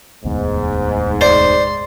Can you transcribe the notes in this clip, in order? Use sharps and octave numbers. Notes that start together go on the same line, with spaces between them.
E1 D2 G#2 B3
C5 D5 C6